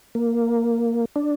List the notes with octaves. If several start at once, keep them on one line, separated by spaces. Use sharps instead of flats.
A#3
D4